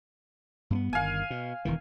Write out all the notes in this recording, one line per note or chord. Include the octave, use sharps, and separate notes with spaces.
G2 A#3 B3
G1 D#3 F5 G#5
B2
E1 D#3 E3